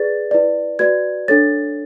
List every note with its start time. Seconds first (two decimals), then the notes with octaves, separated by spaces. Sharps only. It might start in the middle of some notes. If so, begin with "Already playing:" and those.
Already playing: G#4 B4 D5 A6
0.31 E4 B4 D5
0.79 F#4 B4 D5 G#6
1.28 D4 A4 C#5 A6